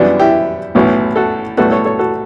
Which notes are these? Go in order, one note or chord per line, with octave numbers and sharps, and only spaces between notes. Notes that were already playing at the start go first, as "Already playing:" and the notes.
Already playing: F#2 E3 G3 B3 D4
E4 G4
B1 A2 E3 B3
F#4 A4
B1 A2 G3 B3 F#4 A4
A4 C#5
A4 C#5
F#4 A4